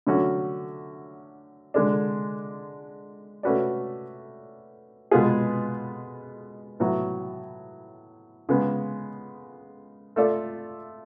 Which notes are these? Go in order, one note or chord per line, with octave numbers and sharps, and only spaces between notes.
D3 F#3 A3 C#4 F#4
D3 G#3 D4
A3 C#4 F#4 B4 D5
B2 G#3 B3 F4 G#4
A2 F#3 B3 F#4
C#3 G#3 B3
A3 F4 A4 D5